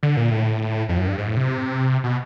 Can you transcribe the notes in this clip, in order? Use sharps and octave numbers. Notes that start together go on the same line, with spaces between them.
D3
A#2
A2
F2
F#2
G2
G#2
A2
C3
B2